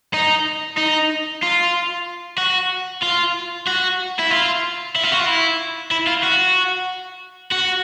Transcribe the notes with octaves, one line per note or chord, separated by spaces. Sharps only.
D#4
D#4
F4
F#4
F4
F#4
E4
F4
E4
F4
F#4
F4
E4
E4
F4
F#4
F#4